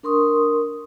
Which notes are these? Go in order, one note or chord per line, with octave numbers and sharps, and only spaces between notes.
D4 A#4 C6 C#6 D#6